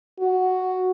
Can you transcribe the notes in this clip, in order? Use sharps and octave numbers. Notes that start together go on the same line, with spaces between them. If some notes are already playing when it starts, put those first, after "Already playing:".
F#4